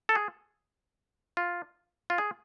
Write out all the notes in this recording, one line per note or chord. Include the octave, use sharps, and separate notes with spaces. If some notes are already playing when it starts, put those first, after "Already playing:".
A4
G#4
F4
F4
G#4